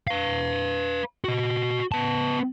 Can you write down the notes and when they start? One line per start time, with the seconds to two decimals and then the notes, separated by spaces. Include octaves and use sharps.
0.07 B4 F5
1.24 F#4 D#5
1.92 B3 A5